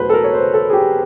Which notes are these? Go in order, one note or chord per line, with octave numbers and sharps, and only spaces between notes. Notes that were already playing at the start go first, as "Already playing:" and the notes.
Already playing: E2 B2 F#3 A3 B4 C5
A4
A#4
C#5
C5
A4
G#4
G4